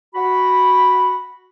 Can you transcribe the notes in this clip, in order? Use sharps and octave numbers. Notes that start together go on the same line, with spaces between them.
F#4 B5